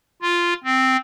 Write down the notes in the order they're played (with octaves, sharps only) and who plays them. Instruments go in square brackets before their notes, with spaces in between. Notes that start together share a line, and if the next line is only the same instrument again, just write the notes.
[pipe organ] F4
C4